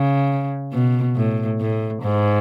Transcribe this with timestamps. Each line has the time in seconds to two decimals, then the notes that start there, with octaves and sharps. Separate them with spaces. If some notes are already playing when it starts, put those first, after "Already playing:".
Already playing: C#3
0.73 B2
1.16 A2
1.60 A2
2.02 G#2